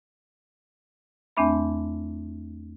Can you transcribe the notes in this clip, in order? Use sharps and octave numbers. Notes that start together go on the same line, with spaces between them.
E2 A3 C4 D4 E5 B5